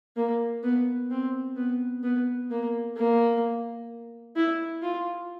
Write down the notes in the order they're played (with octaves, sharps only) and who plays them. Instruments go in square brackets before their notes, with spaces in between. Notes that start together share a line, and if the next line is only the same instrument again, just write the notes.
[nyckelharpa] A#3
B3
C4
B3
B3
A#3
A#3
E4
F4